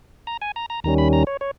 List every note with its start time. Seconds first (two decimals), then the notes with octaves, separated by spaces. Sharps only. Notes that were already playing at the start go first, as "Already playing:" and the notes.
0.27 A#5
0.42 G#5
0.56 A#5
0.70 A#5
0.84 D#2 D#3 G3 C#4 A#5
0.98 B5
1.13 A#5
1.27 C#5
1.41 C#5